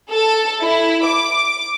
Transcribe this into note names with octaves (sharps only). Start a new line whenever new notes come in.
A4
E4
D6